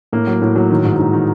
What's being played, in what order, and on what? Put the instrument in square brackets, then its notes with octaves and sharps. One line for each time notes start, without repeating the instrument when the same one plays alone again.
[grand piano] A2 A#3
F#3
A2
F#3
D#3
G#2
G#2
D#3